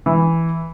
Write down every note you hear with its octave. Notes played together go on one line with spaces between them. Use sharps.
E3